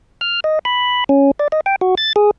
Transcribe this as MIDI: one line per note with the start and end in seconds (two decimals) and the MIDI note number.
0.21 0.40 89
0.44 0.59 75
0.65 1.04 83
1.09 1.31 61
1.39 1.48 74
1.52 1.61 75
1.66 1.76 79
1.81 1.95 66
1.98 2.13 93
2.16 2.31 68